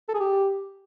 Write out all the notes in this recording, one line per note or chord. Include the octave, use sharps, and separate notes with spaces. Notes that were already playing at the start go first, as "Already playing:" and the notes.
A4
G#4
G4